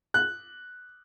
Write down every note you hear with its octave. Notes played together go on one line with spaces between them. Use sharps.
F#6